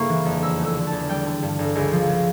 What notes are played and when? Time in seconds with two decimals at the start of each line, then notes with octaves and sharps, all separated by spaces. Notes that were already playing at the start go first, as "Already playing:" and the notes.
Already playing: G1 C#3 A#3 E4 A#5 C#6
0.09 E3
0.26 F2
0.42 E2 E6
0.59 A3
0.64 E6
0.76 D3
0.87 E2 A5
1.09 G3 G5
1.26 D3
1.42 G2
1.59 G1
1.75 C#2
1.92 F3
2.08 C#3